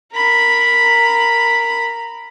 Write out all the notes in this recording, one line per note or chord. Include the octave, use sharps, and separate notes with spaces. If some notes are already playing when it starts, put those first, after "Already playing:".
A#4 B5